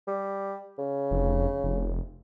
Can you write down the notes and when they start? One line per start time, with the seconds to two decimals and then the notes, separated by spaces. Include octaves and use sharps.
0.08 G3
0.78 C#3
1.11 F1
1.63 F1